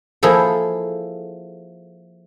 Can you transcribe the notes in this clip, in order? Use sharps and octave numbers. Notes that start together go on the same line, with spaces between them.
F3 A#3 E4 G#4 A4